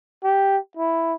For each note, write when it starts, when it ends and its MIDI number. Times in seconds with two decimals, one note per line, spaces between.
0.24 0.57 67
0.77 1.14 64